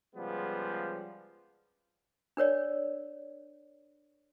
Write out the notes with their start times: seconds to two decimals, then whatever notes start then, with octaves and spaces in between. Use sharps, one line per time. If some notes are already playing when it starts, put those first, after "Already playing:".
0.15 C#3 F3 G3 G#3 B3
2.37 D4 A#4 C#5 D5